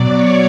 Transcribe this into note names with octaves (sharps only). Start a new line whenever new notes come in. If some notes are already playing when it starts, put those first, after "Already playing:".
Already playing: B2 F#3 D5 D6
C#5 C#6